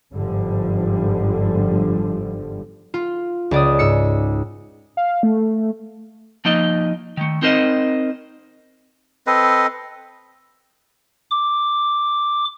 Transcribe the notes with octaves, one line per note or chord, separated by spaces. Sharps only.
G1 G#2 D3 F3 G3
F4
C#2 D5 D#6
G#2 E6 C#7
F5
A3
F3 A#3 D#4 D#5
D#3 A3
C4 D#4 A#4 C5 D5 D#5
C4 A4 B4 D#5
D6